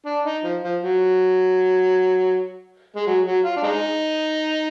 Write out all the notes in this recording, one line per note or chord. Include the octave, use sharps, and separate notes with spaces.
D4
D#4
F3
F3
F#3
G#3
F#3
F#3
F4
D4
G#3 D#4